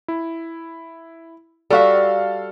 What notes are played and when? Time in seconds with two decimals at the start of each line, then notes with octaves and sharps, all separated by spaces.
0.08 E4
1.70 G3 F#4 A4 E5 F5